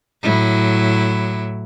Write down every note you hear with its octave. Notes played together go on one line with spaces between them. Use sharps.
A2 F#3 E4